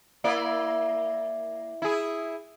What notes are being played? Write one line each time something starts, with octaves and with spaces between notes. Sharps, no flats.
A#3 E4 D5
E4 G#4